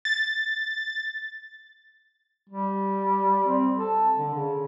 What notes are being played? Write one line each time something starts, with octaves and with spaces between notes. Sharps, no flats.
A6
G3
C4
A4
D3
C#3